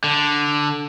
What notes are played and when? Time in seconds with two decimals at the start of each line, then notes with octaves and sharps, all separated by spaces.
0.04 D3